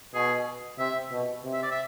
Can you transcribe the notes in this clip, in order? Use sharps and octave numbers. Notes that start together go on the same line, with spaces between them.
B2 G#4
C3 E5
B2
C3
E5
D5
E5